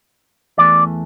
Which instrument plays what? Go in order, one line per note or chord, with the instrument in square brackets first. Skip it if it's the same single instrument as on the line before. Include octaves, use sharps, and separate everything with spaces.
[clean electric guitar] E2 E3 A3 D5